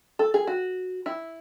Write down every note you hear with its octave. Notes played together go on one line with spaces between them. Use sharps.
A4
G#4
F#4
E4